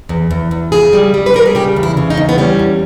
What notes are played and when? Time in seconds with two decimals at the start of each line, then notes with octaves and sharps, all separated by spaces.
0.09 E2
0.31 E2
0.51 E2
0.72 C#3 G#4
0.93 G3
1.14 G3
1.26 B4
1.34 G3 A#4
1.46 G#4
1.55 C#3 G4
1.76 E2
1.83 E4
1.97 C#3
2.10 D#4
2.17 E2
2.29 B3
2.38 G3 C#4
2.59 E2